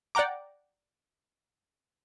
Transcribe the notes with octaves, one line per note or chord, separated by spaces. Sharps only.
D5 F#5 G5 A#5 D6